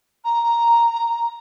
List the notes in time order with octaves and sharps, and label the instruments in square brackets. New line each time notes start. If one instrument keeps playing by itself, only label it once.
[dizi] A#5